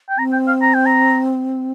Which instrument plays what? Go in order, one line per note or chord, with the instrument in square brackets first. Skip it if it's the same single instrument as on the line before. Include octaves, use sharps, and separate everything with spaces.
[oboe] G5
[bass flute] C4 [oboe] A#5
[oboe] G5
F5
A#5
G5
A#5